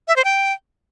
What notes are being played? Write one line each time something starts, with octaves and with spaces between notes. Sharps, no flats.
E5
C5
G5